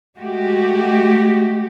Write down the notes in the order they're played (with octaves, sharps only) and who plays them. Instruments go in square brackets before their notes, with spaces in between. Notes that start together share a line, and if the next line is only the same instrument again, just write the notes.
[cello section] G#3 A3 F#4 G4